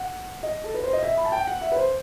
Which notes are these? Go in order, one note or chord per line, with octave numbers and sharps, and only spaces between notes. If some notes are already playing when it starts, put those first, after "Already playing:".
Already playing: F#5
D#5
A4
B4
C5
D#5
E5
B5
A5
G5
F#5
E5
B4
C5